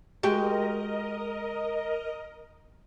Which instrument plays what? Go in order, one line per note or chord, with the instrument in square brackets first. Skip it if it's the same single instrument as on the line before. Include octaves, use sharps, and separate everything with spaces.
[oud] G#3 [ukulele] F#4 G4 G5 [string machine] A#4 D#5